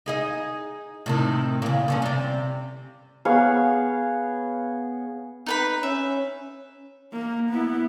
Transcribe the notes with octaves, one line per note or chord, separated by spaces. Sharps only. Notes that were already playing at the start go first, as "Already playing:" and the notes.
D#4 G#4 D#5
A2 C3 D#3
A#2 C#3
G2 D3 C#4
C3 D5
B3 G#4 C#5 F5
D#4 B4 B5
C#4 E5
A#3
B3 E4